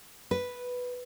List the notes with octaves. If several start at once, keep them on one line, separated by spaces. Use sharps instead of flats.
B4